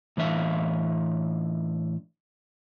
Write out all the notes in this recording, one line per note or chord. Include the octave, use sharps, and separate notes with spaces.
A2 E3 D4 E5 F5